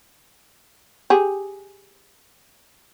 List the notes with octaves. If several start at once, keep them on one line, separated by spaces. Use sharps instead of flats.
G4 G#4